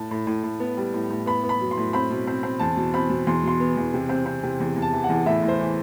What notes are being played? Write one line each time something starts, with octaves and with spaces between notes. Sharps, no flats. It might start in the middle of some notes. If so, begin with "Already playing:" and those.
Already playing: A2 A5
A2
A2
A2
B3
G3
A2
A2
B3 B5
B3
B5
F#3
C6
A2
C4 B5
B2
C4
C4
E2 A5
B2
C4 B5
B2
E2 C6
B2 C6
B3
E2
C3
C4
C4
C3
E2
E2
A5
E3
F#5
E2
A2 E5
A2
C5
E3